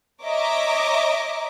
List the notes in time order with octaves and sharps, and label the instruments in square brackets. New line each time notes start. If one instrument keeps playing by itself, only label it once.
[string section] C#5 D#5 E5 A#5 D6